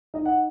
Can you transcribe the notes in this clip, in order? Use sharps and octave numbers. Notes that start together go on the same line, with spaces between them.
D#4 D#5
F#5